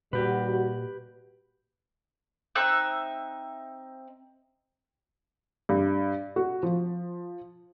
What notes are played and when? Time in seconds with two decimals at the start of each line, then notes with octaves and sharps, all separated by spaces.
0.13 D#2 A#2 G3 F#4 G4 B4
2.55 C4 D#4 E5 F#6
5.69 G2
6.36 F#4
6.63 F3